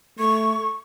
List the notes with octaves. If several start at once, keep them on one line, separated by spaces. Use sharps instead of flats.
A3 C#6